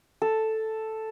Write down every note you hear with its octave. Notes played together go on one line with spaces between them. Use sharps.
A4